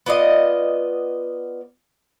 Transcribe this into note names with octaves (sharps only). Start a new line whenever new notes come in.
B3 F4 D5 D#5